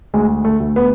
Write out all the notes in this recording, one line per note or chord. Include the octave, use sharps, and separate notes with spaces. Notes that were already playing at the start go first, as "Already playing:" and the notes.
D2 G#3
A3
D2
B3